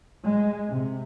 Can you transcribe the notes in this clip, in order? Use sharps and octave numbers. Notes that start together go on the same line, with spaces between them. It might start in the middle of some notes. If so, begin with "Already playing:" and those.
G#3
C3